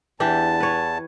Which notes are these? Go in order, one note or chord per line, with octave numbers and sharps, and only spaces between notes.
E2 E3 D4 G4 A5
B4 C#5